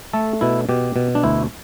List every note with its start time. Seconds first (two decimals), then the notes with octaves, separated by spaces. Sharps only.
0.13 A3 A4
0.41 B2 E4
0.69 B2 G4
0.96 B2
1.15 D4
1.23 D2 E4